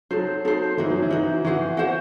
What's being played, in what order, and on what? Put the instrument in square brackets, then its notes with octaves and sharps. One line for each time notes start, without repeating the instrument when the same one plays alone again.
[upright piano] F#3 [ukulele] D#4 A4 C5
[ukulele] D#4 A4 C5
[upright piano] E3 [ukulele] D#4 F#4 C5
[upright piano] F#3
E3
[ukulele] D#4 F#4 C5
[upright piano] E3 [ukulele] F#4 C5 F#5
[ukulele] F#4 C5 F#5